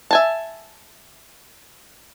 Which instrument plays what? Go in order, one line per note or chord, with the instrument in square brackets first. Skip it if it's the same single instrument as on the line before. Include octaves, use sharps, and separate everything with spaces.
[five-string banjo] E5 G#5 A5